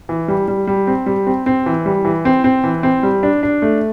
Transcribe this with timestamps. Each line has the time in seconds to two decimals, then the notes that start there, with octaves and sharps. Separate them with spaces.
0.09 E3
0.28 G3
0.48 G3
0.67 G3
0.87 C4
1.06 G3
1.27 C4
1.46 C4
1.66 E3
1.86 G3
2.05 E3
2.25 C4
2.44 C4
2.64 E3
2.83 C4
3.03 G3
3.23 D4
3.43 D4
3.62 A3